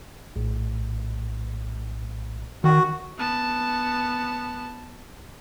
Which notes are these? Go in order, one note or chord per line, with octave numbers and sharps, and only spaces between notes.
A#1 A2
D#3 F#4
B3 A5